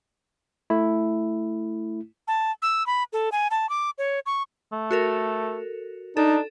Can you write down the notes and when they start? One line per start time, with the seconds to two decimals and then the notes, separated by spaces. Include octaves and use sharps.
0.70 A3 E4
2.28 A5
2.62 E6
2.86 B5
3.13 A4
3.32 G#5
3.51 A5
3.69 D6
3.98 C#5
4.26 C#6
4.72 A3
4.91 F#4 A4 A#4
6.17 D4 D#4 A4